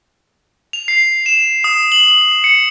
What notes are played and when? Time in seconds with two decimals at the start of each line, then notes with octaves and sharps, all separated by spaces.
0.73 F7
0.88 C7
1.26 E7
1.64 D#6
1.92 F#7
2.44 C#7